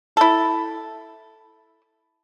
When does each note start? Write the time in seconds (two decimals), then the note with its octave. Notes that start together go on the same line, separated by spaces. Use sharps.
0.17 E4 A4